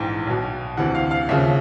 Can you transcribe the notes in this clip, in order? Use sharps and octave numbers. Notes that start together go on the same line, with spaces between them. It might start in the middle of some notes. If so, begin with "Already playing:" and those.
Already playing: A#1 G#2 E3 G5
B1 B2
D2 C3 E3 F#5
F5
F5
D#2 C#3 F3 E5